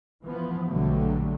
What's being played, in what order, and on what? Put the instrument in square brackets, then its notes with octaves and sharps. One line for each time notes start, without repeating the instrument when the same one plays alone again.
[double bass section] E3 F3 B3
A#1 B2 D3 F#3 G3 A3